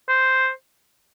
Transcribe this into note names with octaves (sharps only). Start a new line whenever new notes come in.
C5